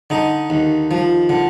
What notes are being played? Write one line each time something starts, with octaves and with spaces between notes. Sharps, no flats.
D3 D#4
D#2
F3
D3